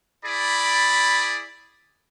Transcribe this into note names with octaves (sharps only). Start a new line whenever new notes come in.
E4 G#4 D5 B5